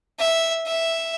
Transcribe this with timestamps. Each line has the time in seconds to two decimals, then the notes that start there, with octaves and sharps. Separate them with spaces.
0.19 E5
0.66 E5